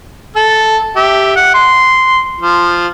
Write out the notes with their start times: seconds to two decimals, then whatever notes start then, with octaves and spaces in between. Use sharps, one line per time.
0.36 A4
0.96 G4 E5
1.36 F#5
1.54 C6
2.41 F3